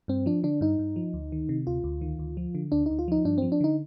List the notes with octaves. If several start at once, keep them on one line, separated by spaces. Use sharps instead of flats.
G2 C4
F3 D4
D3 D4
G2 D#4
G2
F3
D2
D#3
C3
D2 F4
D2
D#3
D2
F3
D3
D2 D4
D2 D#4
F4
F3 D#4
G2 D4
F3 C4
D4
D3 D#4